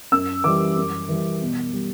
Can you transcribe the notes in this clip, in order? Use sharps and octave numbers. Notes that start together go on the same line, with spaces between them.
F#2 E6
E3 G3 D6
F#2
E3 G3
B2
G3